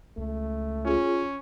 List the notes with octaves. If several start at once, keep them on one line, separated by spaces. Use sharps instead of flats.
C#2 A3
C#4 F4 G#4